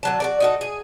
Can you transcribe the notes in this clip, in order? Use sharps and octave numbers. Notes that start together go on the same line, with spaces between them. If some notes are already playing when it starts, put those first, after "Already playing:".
D3 F#3 A5
F#4 A4 D5
D#4 F#4 A4
G#4